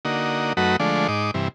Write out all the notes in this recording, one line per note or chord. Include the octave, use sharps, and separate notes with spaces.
D3 A#3 D#4 F#4
F#2 F#3 A3 D#4 F#4 B4
D3 F3 G#3 A3 D4
G#2 D#4 D6
G2 C3 E3